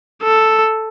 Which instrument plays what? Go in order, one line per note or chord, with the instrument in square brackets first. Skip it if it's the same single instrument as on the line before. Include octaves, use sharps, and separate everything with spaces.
[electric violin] A4